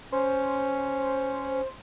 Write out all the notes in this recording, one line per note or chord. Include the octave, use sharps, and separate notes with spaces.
C#4 C5